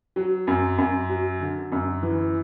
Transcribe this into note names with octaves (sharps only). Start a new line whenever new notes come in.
F#3
F#2
F#2
F#3
D3
F#2
E3